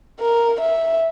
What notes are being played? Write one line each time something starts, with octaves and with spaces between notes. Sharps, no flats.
A#4
E5